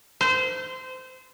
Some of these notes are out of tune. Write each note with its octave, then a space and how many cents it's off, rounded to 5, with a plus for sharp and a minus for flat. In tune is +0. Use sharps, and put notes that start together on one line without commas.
C5 -25